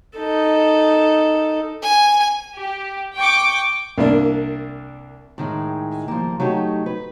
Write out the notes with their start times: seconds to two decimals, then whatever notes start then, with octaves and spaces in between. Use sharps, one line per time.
0.17 D#4 A4
1.82 G#5
2.54 G4
3.15 G5 C#6 D6
3.98 C2 A#3 D4
5.38 A2 D#3 G#3
6.08 F3 G3 A#3
6.40 F#3 A3 D#4 G4
6.86 B4